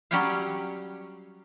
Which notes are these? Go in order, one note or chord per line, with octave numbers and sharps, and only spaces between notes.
F#3 G3 C#4 G4 C#5 F5